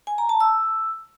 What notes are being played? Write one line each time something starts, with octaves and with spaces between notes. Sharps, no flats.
G#5
A#5
A5
E6